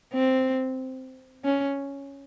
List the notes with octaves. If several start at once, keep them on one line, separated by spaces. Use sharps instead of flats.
C4
C#4